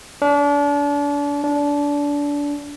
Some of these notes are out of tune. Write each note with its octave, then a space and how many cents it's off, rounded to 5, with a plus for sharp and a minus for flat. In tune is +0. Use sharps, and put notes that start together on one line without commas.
D4 -35
D4 -25